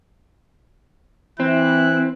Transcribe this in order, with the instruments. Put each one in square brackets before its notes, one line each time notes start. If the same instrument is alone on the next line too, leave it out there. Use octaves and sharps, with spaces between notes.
[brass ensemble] E3 E4 [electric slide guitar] C4 [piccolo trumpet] F#6